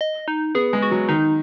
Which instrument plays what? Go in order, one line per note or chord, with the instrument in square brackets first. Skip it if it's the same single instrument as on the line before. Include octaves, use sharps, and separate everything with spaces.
[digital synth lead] D#5
D#4
[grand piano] B3 [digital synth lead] G#4
[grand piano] G#3
[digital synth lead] F#4
[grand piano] F#3
[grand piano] D#3 [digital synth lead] D#4